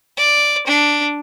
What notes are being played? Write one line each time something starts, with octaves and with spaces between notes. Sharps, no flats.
D5
D4